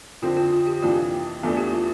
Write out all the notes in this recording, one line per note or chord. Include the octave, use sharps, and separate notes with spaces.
F2 D3 F3 C4 F4
F4
F4
G4
F2 C3 E3 A#3 D4 F4
E2 E3 A3 D4 F4
G4
F4